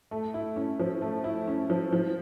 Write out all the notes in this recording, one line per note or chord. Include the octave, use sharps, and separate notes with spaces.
A3
E4
C#4
F3
A3
E4
C#4
F3
F3